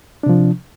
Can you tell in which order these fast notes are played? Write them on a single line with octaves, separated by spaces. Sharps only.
D4 C3 F3